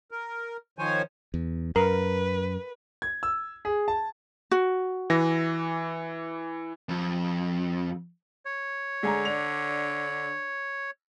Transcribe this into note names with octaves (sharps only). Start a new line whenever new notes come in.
A#4
D#3 F3 C5 C#5 G#5
E2
F#2 A#4 B4
G#6
E6
G#4
A5
F#4
E3 A#6
F2
C#5
D3 G#3 G#5 A#5
D4 F7